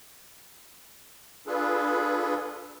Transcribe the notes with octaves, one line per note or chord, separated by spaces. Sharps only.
D4 F4 G#4 A4 B4